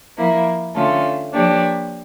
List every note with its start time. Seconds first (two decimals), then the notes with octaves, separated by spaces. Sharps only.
0.17 F3 A#3 E4
0.75 D3 A3 C#4 F4 A4
1.34 F3 A#3 D4 G4 C#5